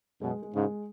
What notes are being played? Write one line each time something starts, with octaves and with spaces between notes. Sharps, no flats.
F#2 B2 G#3
G#3
G#2 C#3
G#3